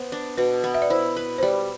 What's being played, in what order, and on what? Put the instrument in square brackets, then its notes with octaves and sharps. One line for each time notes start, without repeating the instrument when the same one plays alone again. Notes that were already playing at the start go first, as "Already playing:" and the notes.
Already playing: [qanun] B3 C5
D4
[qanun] B2 [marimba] B4
[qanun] B3
[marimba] E5
D5
[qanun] E4 [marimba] C5
[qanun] B4
[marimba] C5
[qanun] G3 [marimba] D5